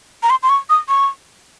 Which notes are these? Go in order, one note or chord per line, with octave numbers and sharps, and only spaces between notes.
A#5
C6
C6
C#6
D#6
C#6